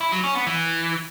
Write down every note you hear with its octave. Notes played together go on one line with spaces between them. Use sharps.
E4
F#3
C#4
B3
E3